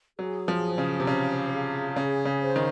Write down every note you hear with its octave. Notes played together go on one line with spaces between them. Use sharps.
F#3 G#4
F3
C5
C#3
C3
C#3 F5
G#4
C#3 G#4
C#3
C5
D#3